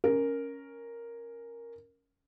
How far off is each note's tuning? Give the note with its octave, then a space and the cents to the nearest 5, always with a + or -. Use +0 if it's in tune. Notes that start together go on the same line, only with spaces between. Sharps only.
C#4 +0 A#4 +0